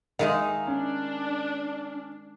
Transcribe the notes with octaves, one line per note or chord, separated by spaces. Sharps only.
D#3 G#3 D#4 E5 F5
C#4 D4